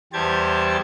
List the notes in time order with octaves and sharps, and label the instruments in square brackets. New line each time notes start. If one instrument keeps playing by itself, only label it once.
[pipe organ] E2 G3 G4 C5 A5 G#6